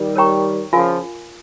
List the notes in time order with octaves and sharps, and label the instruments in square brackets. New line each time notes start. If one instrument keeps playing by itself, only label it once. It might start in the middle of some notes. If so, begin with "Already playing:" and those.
Already playing: [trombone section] D#3 G3
[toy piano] A#4 C#5 G5 A#5 C#6
[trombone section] C#3 F3 [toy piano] F4 A#4 F5 G#5